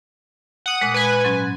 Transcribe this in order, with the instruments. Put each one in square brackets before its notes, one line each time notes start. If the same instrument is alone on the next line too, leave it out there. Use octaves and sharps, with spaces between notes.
[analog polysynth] F#5 D#6
[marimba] A#2 G#3
[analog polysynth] B4 G#5
[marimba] G#2 F#3 C#4